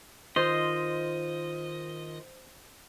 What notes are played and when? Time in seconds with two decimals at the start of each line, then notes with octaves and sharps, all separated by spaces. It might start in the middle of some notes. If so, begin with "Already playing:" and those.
0.36 D#3 F4 C5 D#5